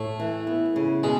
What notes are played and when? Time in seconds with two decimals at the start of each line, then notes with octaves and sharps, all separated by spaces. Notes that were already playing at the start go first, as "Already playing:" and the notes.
Already playing: A2 A3
0.20 E3
0.47 B3
0.76 C#3
1.03 B2 G#3